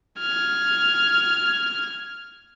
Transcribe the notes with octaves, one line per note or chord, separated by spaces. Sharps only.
F6 G#6